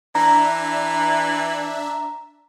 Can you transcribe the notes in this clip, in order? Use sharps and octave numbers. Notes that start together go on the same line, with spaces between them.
E3 D4 E5 A#5